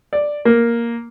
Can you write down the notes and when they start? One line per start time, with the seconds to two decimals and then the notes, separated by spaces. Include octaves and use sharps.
0.13 D5
0.45 A#3